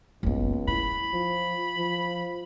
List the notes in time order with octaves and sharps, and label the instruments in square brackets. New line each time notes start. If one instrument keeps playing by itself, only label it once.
[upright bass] F#1 B3 [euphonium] C#2
[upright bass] E4 [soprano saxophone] B5
[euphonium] F3
F3